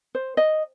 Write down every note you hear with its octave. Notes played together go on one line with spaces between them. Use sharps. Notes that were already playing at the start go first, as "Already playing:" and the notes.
C5
D#5